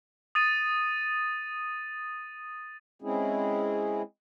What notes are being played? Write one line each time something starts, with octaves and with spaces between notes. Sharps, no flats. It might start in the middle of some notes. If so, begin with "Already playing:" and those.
D#6 A6 D#7
G#3 C4 C#4 E4 G#4